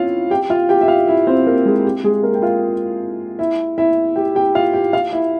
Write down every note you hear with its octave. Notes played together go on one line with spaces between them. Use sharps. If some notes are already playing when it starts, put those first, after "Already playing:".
Already playing: C4 C#4 E4 F4 F5
G4 G5
F4 F5
G4 G5
E5
F4 F5
E4 E5
C4 C5
A#3 A#4
G#3 G#4
G4
G#3 G#4
A#3 A#4
G5
F4 F5
E4 E5
E4 E5
G4 G5
G4 G5
F4 F5
G4 G5
F4 F5
E4 E5